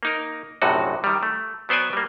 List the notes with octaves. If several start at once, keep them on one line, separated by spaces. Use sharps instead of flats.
A#3 D#4 A#4
A#1 F#2 A2 C3 D#4 F#4
D#3 G3
A3
F#3 B3 C5 D5 G#5
G3 A#3